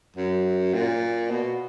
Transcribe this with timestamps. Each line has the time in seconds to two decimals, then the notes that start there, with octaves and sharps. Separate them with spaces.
0.16 F#2
0.74 A#2
1.30 B2